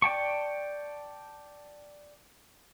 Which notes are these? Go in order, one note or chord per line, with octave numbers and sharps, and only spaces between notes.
D5 G5 A5 C#6